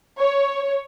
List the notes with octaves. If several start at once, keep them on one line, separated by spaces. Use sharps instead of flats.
C#5